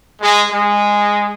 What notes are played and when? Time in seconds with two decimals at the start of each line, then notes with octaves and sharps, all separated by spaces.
0.22 G#3
0.51 G#3